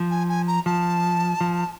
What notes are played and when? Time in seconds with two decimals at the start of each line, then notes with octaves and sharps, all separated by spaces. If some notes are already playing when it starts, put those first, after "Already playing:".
Already playing: F3
0.11 G#5
0.29 G#5
0.47 A#5
0.66 F3 A5
1.41 F3